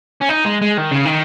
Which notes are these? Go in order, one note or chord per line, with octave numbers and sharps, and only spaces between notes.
C#4
D#4
G#3
G#3
D#3
C#3
D#3